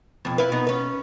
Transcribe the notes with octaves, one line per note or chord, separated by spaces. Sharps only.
F2 B2
E4 F4 B4
B2 B3 D#4
C#4 B4